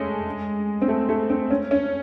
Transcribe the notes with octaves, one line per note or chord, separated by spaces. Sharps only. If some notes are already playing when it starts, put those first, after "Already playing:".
Already playing: G#3 A3 C#4
C4
A3
A3
C4
C#4
C#4